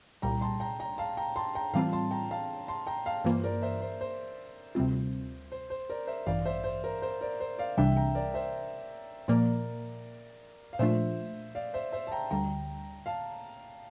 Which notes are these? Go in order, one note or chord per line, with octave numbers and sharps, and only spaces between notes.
C2 A#2 G3 G5 A#5
A5 C6
G5 A#5
G5 A#5
F5 A5
G5 A#5
A5 C6
G5 A#5
A2 E3 G3 C4 F4 F5 A5
A5 C6
G5 A#5
F5 A5
A5 C6
G5 A#5
F5 A5
G2 E3 A#3 F4 C5
A#4 D5
C5 E5
C5
C5
D2 C3 G3 C4 F4
C5
C5
A#4 D5
C5 E5
A1 G2 E3 D5 F5
C5 E5
C5
A#4
C5
A#4 D5
C5
D5 F5
C2 C3 E3 G3 D4 E5 G5
G5 A#5
A#4 D5
C5 E5
A#2 F3 A#3 A#4 D5
F5
A#2 F3 A3 D4 F4 C5 E5
D5 F5
C5 E5
C5 E5
A5
G5 A#5
D2 D3 G3 G5 A#5
F5 A5